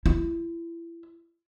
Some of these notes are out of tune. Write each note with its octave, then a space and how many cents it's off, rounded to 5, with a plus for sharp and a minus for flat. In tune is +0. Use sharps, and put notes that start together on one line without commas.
E4 +30